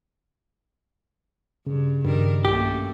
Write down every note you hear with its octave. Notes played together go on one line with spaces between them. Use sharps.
G2 C#3
G2 D#3 G3 A#4
B1 F#2 A3 A#3 G4